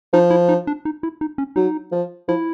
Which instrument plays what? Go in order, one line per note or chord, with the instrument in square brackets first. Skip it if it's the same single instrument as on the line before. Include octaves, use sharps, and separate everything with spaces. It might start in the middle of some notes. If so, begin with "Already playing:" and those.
[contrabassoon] F3 [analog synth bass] D#4
[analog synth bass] E4
D#4
D4
D#4
E4
D#4
C#4
[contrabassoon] F#3 [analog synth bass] D#4
[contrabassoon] F3
[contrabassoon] F3 [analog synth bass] E4